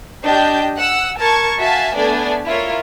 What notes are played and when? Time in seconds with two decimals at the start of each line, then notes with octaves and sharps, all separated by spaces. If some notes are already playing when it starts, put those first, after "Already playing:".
0.24 D4 G4 D#5 G5 G6
0.77 F#5 E6
1.18 A#4 A5 C#6 G#6
1.59 F#4 E5 F5 G#5 A5
1.95 A3 B3 D4 D5 G#5
2.46 E4 F4 A#4 C#5